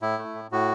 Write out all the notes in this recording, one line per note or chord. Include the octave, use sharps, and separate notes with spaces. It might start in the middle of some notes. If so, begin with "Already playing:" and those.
A2 E4
A3
A2
A2 F#4